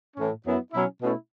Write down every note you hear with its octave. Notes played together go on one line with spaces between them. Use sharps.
A2 E3 C#4
F#2 F#3 B3 E4
B2 F#3 C#4 E4
B2 A3 C#4 E4